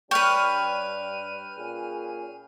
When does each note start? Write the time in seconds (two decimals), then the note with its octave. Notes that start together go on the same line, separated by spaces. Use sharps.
0.11 G2 G3 D4 B4 C#5 G5 F6 D#7
1.58 A#2 C#4 G#4